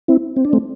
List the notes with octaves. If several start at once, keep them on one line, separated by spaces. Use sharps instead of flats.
C4 E4
C4
D4
A3 C4